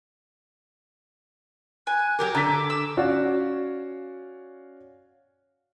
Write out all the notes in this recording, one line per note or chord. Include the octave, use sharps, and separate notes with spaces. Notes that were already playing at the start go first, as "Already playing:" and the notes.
G#5 F#6
F#3 G4 A#4 D6
D3 A4 A#5 B6
E6
C#4 F#4 D5 F5